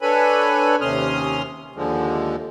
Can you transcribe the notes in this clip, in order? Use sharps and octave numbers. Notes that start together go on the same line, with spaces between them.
D4 A4 B4 C#5 G#5 B5
D#2 C3 C#4 C6 D#6 F6
D#2 D3 F3 G#3